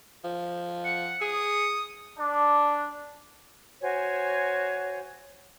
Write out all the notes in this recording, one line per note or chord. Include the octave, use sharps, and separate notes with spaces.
F3
F#5 C#7
G#4 D#6
D4
F#4 C5 C#5 G#5